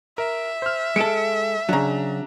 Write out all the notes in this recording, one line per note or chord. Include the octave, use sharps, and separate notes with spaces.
A#4 E5
C5 F6
G#3 A4 C#7 D7 E7
C#3 F#3 D4 A#5